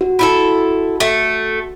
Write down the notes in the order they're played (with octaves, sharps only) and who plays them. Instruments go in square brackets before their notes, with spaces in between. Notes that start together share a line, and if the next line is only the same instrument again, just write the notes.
[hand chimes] F#4
[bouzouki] E4 F4 A4
A3